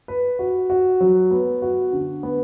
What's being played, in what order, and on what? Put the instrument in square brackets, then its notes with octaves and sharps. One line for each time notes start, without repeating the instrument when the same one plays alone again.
[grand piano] B4
F#4
F#4
F#3
B3
F#4
D3
B3